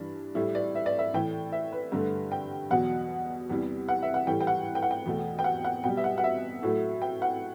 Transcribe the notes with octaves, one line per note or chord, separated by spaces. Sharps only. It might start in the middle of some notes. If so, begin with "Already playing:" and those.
Already playing: G2 E3 D4
A2 G3 E4
D5
E5
D5
E5
A2 E3 A3 G5
E5
B4
G2 D3 A3
G5
E2 B2 F#3 F#5
E2 C3 E3 G3
F#5
E5
F#5
A2 E3 G3 G5
G5
F#5
G5
F#5
G5
E2 B2 A3
G5
F#5
F#5
B2 G3 G5
E5
F#5
F#5
E5
A2 F#3 A3
G5
F#5